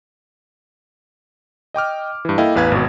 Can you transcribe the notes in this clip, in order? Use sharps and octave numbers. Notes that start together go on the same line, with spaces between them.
D#5 G5 D6 F6
G2 E3
A#3 E4 A4 D#5 F5 G5
A1 E2 B4 F5 G#6
G#1 B2